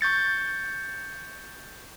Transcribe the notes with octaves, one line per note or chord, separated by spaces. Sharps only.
C#6 G6 A6 C#7